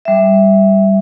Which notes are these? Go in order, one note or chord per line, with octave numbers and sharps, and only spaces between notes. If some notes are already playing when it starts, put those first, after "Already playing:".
G3 E5